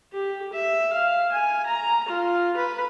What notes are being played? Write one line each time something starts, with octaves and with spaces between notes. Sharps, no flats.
G4
E5
F5
G#5
A#5
F4
B4